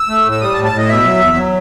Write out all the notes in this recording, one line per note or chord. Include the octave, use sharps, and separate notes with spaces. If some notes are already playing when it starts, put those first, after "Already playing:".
Already playing: E6
A3
A2
E6
G3 D#6
A5
A2
A5
A2
D#5
B2 E5
F#3
E2
F#3